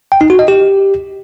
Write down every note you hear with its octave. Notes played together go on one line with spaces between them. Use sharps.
G5
D#4
F#4
D#5
G4